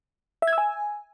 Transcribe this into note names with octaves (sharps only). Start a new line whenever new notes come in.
E5
G#6
E6
G#5